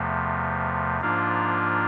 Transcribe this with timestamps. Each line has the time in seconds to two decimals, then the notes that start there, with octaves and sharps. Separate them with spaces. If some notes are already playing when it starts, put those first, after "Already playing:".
Already playing: E2 C3 F3 A3
1.00 G#2 F3 A#3 D4 F4